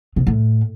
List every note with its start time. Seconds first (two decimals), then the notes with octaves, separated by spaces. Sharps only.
0.16 C3
0.27 A2